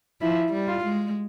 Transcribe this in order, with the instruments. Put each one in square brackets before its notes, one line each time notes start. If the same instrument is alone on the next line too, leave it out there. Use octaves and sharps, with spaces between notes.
[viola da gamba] F3 [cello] E4
[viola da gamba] G3
[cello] F4
[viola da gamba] G#3